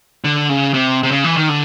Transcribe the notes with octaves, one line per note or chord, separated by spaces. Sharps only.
D3
C#3
C3
C3
C#3
E3
D#3
D3